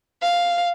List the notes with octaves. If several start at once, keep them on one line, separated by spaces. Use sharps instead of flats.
F5